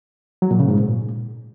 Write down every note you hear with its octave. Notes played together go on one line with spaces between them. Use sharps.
F#3
A#2
C#3
G#2
A#2